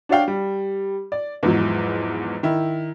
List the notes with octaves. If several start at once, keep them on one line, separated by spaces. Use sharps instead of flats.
D4 F#4 C#5 D5 F5 G5
G3
D5
E2 G#2 F3 F#3
D#3 E4